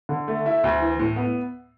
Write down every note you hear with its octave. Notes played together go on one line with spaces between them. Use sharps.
D3
A3
E4
D2
E3
A2
B3